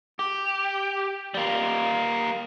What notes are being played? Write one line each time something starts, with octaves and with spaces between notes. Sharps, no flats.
G4
G3 A#3